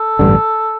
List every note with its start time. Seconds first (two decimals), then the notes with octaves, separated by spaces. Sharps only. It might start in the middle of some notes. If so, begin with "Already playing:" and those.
Already playing: A4
0.19 A1 G2 D3